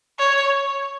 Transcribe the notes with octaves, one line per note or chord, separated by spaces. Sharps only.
C#5